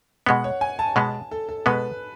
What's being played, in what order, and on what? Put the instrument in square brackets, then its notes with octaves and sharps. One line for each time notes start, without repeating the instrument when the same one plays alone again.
[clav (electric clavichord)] B2 G#3 B3 [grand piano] F#5
[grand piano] C#5
G#5
A5
[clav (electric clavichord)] B2 G#3 B3 [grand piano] A5
[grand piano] A4
A4
[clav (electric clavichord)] B2 G#3 B3 [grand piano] B4